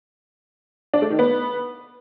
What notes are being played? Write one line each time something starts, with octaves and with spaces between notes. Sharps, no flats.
D4
A3
D#3
B3